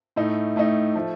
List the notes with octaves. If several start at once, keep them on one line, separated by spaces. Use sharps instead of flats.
A2 A3 D#4
A2 A3 D#4
F3 A3